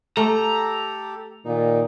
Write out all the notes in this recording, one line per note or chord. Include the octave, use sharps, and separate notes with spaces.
A3 G4 A4 A#5
A#2 D#3 D#4